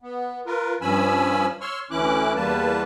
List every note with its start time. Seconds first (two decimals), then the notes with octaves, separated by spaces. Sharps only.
0.02 B3
0.46 F4 A#4 B4
0.81 G2 F3 C#4 G#5 B5 E6
1.61 C#5 C6 C#6 E6 F6
1.91 D2 E3 C#4 E4 D6 F#6
2.36 E2 G3 A#3 B4 A5